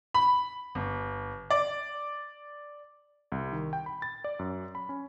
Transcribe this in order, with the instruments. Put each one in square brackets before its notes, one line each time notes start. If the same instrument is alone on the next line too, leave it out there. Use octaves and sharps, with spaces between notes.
[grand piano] B5
G1
D5
[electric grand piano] C2
D#3
G5
B5
A6
D5
F#2
B5
C#4